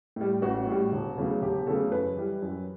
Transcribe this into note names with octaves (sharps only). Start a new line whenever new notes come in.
A2 G3
A1 F#4
A2 G3
E1
E2 C#3 F#3 A3
E1 G4
E2 C#3 F#3 A3 A4
F#2 B4
E3 G3
F#2